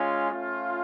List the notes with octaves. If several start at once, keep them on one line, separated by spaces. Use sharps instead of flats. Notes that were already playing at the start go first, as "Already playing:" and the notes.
Already playing: G#3 C#4 F4
A3 C#4 F4